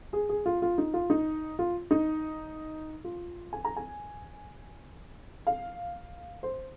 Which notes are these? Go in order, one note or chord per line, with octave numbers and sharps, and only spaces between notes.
G#4
G#4
F4
F4
D#4
F4
D#4
F4
D#4
F4
G#5
A#5
G#5
F5
C5